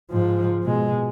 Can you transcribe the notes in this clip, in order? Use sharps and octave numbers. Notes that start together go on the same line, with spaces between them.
G#2 F3
B2 G#3